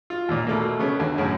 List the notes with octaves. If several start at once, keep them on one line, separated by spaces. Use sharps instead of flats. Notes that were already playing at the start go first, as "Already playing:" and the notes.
F4
D#2 A#2
B2 A3 A#3
C#3 B3 C#4
D#2 D3
F#2 A2 C#3